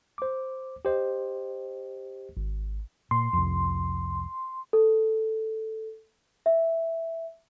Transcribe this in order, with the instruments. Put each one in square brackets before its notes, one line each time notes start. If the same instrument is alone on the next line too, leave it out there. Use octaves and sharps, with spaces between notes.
[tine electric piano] C5 D6
G4 C5 D#5
G#1
[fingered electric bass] A#2 [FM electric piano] C6
[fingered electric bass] C2 F2
[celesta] A4
E5